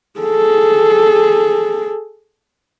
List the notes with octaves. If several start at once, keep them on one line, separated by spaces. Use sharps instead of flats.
G#4 A4